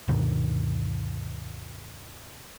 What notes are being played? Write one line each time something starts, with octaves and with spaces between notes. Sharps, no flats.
D2 G2 B2 D#3